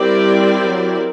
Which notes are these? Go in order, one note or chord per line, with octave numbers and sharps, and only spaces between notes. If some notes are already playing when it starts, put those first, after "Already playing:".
Already playing: G3 C4 E4 G4 A#4 D5
F#3